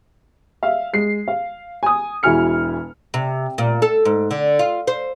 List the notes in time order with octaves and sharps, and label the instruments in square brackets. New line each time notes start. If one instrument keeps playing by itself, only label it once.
[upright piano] E5 F5
G#3 C7
F5
G#5 D#6
E1 E4 F#4 G#5 F6 C#7
[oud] C3
A#2
A4
G#2
D3
F4
C5